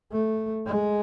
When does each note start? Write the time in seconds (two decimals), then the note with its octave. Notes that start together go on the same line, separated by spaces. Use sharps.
0.12 A3
0.66 G#3